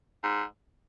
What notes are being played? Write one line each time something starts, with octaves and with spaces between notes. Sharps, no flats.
G#2